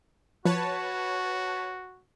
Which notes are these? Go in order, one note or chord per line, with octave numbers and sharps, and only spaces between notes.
F3 F#4 B4 C#5 A5